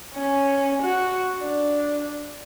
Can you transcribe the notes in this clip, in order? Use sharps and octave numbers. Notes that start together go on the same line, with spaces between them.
C#4
F#4
D4